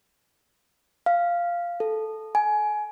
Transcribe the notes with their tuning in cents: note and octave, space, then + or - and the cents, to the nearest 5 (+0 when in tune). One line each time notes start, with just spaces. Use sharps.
F5 -5
A4 -10
G#5 +20